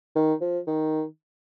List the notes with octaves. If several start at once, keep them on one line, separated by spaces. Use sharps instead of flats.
D#3
F3
D#3